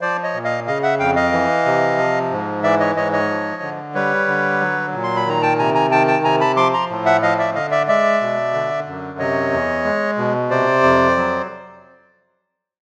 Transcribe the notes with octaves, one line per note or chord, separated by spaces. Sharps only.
F3 C5 D5
C#5 D#5
A#2
D#5 F5
C#3 D#5 F5
E5 F#5
F2 F5 G5
D#5 F5
E3
C3
F3
G#2
E3 D5 E5
C#5 D#5
G#2 C#5 D#5
C#5 D#5
F3
D3
G3 B4 C#5
D3
F#3
A#2
C6
B5
D#3 A#5
G5 A5
C3 G#5 A#5
G#5 A#5
D#3 G5 A5
G5 A5
C3 G#5 A#5
A5 B5
F3 C6 D6
A#5 C6
A2
E5 F#5
F3 D#5 F5
D5 E5
D3 D#5 F5
D5 E5
G#3 D5 E5
B2
D3
F#2
C3 C#5 D#5
E2
G#3
B2
C3 C5 D5
F2
F#3